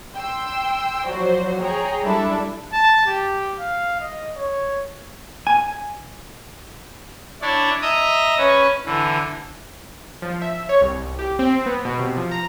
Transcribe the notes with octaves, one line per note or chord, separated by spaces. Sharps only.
G5 C6 E6
F3 F#3 F#4 C5 D5
G#4 C#5 G5 A#5
G3 D4 E4 A4 D5 E5
A5
G4
F5
D#5
C#5
G#5
D4 E4 C#5 D5
D#5 E5 A#5 D#6
C#4 B4 C#5
D3 E3
F3
E5
C#5
C2
C2
G4
C4
B3
B2
C3
F3
A#5